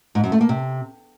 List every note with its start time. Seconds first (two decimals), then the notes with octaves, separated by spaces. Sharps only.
0.15 G#2
0.24 F#2
0.32 A3
0.41 A#3
0.49 C3